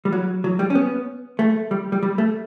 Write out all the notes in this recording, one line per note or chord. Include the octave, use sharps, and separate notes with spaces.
G3
F#3
F#3
G3
C#4
B3
A3
G3
G3
G3
A3